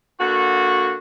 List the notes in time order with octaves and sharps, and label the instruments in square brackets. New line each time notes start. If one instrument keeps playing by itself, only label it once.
[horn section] D3 A#3 F#4